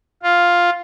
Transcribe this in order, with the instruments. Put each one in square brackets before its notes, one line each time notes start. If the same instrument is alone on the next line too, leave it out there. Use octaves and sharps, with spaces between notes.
[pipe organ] F4